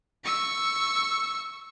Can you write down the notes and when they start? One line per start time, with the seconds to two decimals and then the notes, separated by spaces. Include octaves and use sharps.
0.24 C#6 E6